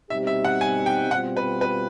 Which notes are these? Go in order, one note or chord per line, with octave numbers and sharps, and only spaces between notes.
B2 G3 C4 D#4 G4 E5
E5
F#5
G#5
G5
B2 G3 C4 F4 F#5
B4
B4